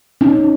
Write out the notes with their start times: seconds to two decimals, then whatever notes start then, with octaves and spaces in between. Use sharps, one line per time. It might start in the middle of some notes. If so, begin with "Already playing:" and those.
0.21 C#4 D#4